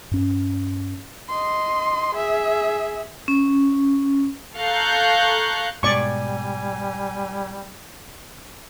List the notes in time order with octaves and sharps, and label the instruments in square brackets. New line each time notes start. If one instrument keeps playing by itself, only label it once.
[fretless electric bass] G2 C#4
[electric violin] D#5 C6
G#4 E5
[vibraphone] C#4
[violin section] A4 F5 A#5 C#6 F#6 G6
[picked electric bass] G#2 B2 [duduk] G3 [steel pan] D5 C#6 [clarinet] G#5